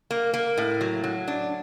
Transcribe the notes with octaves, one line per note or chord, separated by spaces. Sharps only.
A#3
A#3
A2
F#3
F#3
D4